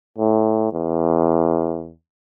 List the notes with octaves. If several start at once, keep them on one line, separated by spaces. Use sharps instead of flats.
A2
E2